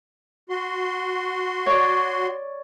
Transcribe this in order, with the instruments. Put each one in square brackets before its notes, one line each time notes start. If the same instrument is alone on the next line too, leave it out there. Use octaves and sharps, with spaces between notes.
[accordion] F#4 C6
[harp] C#5 D5